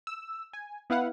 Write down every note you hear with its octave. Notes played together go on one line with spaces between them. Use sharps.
E6
G#5
B3 E4 B4 F5 F#5